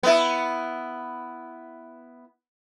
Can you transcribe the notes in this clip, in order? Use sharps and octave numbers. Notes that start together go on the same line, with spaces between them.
B3 E4